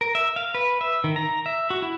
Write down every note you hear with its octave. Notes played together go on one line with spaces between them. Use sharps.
A#4
E5
F5
B4
E5
D#3
A#5
E5
F#4
E4